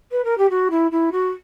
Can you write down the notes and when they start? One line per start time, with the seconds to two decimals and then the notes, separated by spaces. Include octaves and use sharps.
0.12 B4
0.25 A#4
0.38 G4
0.50 F#4
0.71 E4
0.91 E4
1.12 F#4